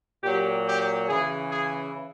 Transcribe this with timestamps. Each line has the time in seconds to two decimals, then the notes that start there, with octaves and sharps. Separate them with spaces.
0.24 A#2 F#3 G4
0.66 G4
1.08 C#3 E3 G#4
1.50 G#4